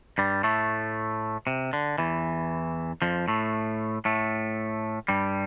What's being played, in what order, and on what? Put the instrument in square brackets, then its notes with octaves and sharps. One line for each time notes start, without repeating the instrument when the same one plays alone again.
[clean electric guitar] G2 G3
A2 A3
C3
D3
E2 E3
F2 F3
A2 A3
A2 A3
G2 G3